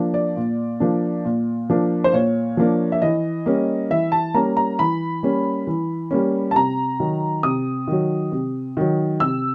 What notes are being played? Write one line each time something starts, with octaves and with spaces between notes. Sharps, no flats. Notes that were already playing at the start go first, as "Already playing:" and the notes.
Already playing: F3 A#3 D4
D5
A#2
F3 A#3 D4
A#2
F3 A#3 D4
C5
A#2 C#5
F3 A#3 D4
E5
E3 D#5
G3 A#3 C#4
E3 E5
A5
G3 A#3 C#4 A#5
A#5
E3 B5
G3 A#3 C#4
E3
G3 A#3 C#4
A5
C3 A#5
D#3 F#3
C3 D#6
D#3 F#3
C3
D#3 F#3
C3 E6